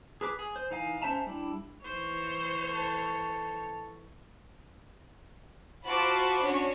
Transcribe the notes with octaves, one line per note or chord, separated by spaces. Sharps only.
G#4 B4 D6
G#4
C5
E3 D#4 F5 G#5
C#4 C5 E5 A5 A#5
G3 D4 E4
E3 C5 C#5
A4
F4 F#4 C5 A5 B5 D6
C#4 D4 F#4 C#5